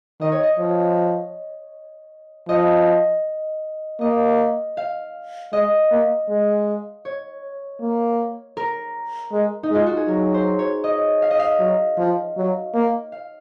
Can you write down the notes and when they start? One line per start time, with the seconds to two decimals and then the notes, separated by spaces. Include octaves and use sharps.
0.21 D#3 D#5
0.32 C#5
0.43 D#5
0.59 F3
2.49 F3 D#5
4.01 A#3 D#5
4.77 F5
5.53 G#3 D#5
5.91 A#3
6.29 G#3
7.05 C#5
7.81 A#3
8.57 A#4
9.32 G#3
9.63 D#4
9.71 G#3 F4
9.86 F#4
9.97 G#4
10.08 F#3 A#4
10.34 C5
10.59 C#5
10.84 D#5
11.22 F5
11.31 D#5
11.39 F5
11.60 F#3
11.98 F3
12.37 F#3
12.74 A#3
13.12 F5